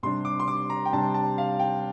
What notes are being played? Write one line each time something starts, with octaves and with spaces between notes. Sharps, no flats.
C3 G3 D4 C6
D6
C6
D6
A#5
G5
C3 G3 D4 A5
A5
F5
G5